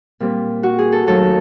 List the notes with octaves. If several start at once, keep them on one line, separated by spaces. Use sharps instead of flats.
A#2 G3 C4
F#4
G#4
A4
D#2 D#3 F#3 A3 A4